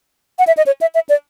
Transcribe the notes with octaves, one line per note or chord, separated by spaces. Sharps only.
F#5
E5
D#5
C#5
E5
E5
D5